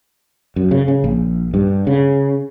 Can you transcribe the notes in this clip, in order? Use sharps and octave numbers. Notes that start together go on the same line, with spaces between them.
F#2
C#3
C#3
A#1
G2
C#3